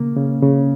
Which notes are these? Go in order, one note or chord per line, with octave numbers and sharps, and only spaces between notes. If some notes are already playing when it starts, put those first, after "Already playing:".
Already playing: C#3 A#3
C#3
C#3